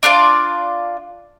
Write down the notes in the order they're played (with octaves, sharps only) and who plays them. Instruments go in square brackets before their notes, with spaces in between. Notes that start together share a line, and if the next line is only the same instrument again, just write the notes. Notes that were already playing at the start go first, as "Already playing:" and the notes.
[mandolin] D4 F4 B4 D5